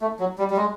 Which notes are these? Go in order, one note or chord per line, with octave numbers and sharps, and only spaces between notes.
A3
F#3
G3
G3
G#3